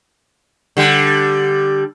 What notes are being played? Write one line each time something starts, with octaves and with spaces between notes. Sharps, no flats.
D3 G3